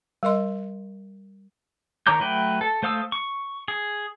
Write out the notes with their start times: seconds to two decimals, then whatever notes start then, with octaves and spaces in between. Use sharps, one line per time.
0.23 G3 A#4 D#5 C6
2.07 D#3 C#5 A#5 D6 G6
2.19 F#3 A3 B4 G5
2.61 A4
2.83 A3 C5 F5 D#6 E6
3.12 C#6
3.68 G#4